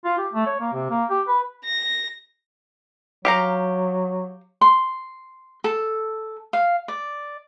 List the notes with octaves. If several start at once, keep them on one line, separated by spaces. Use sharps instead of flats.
F4
G4
A3
C#5
A#3
C3
A#3
G4
B4
A#6
F#3 G4 F5 A#5
C6
A4
F5
D5